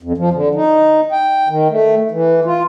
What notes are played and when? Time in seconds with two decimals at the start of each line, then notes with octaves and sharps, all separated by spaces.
0.03 F2
0.18 F3
0.33 D3
0.55 D#4
1.12 G5
1.49 D#3
1.70 A3
2.11 E3
2.45 F4